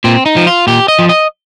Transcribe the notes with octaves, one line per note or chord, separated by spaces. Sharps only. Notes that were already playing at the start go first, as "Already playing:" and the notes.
A#2 C4
D#4
F3
F4
A#2 G4
D#5
F3
D#5